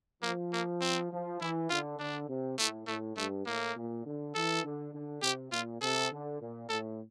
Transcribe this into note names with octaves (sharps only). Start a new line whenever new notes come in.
F3 A#3
A#3
C4
F3
E3 E4
D3 F4
D3 D4
C3
A2 A3
A2 A3
G2 A3
A2 A#3
A#2
D3
E3 A4
D3
D3
C3 G4
A#2 F4
C3 A4
D3
A#2
A2 A4